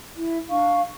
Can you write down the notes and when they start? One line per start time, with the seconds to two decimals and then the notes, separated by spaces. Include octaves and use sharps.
0.15 E4
0.49 D4 F5 C#6